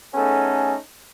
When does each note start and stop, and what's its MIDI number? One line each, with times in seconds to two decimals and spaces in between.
0.14 0.74 57
0.14 0.74 59
0.14 0.74 61
0.14 0.74 63
0.14 0.74 68
0.14 0.74 69